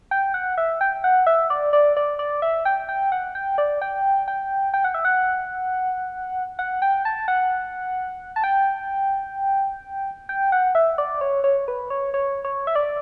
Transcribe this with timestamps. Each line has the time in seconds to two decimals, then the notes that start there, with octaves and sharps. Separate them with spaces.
0.11 G5
0.34 F#5
0.58 E5
0.81 G5
1.04 F#5
1.27 E5
1.50 D5
1.73 D5
1.97 D5
2.19 D5
2.42 E5
2.65 G5
2.89 G5
3.12 F#5
3.35 G5
3.58 D5
3.82 G5
4.28 G5
4.74 G5
4.84 F#5
4.94 E5
5.05 F#5
6.59 F#5
6.82 G5
7.05 A5
7.28 F#5
8.36 A5
8.44 G5
10.29 G5
10.52 F#5
10.75 E5
10.98 D5
11.21 C#5
11.44 C#5
11.68 B4
11.90 C#5
12.14 C#5
12.45 C#5
12.67 E5
12.76 D5